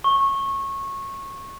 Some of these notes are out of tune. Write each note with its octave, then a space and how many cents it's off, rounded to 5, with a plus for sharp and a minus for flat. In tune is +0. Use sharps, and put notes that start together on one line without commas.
C#6 -20